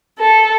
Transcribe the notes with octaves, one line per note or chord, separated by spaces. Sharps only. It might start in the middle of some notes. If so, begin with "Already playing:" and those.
A4